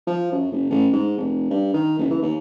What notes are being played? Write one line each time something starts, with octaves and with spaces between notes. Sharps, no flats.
F3
F#2
F#1
A1
G#2
F1
G2
D#3
F#1
E3
D#2